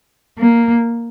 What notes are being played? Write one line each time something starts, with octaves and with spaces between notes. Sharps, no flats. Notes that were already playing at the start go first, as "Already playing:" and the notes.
A#3